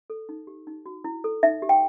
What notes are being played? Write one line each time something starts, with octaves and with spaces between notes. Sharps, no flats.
A4
D#4
G4
D#4
F#4
E4
A4
D#4 E5
G4
G5